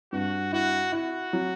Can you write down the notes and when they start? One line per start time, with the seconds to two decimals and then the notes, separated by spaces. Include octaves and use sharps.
0.13 G2 F#4
0.52 E4 F#4
0.92 E4 F#4
1.33 F#3